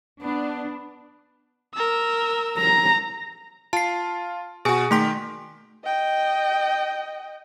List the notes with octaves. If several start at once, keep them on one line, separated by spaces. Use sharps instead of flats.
B3 D4
A#4 E6
A#5
F4 A5 C7
B2 F#4 G#4 G#5
D#3 A3 G5 C6 B6
D#5 G5